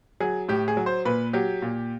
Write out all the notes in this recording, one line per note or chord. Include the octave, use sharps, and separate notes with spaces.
F#3 G#4
A2 G4
G#4
F#3
C5
A#2 B4
F#3 G4
A#2